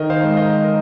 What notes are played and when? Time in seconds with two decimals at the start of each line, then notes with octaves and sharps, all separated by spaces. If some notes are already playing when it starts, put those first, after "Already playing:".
Already playing: D#3 A#4 D#5
0.10 C5 F5
0.24 G#3
0.37 A#4 D#5
0.64 A#4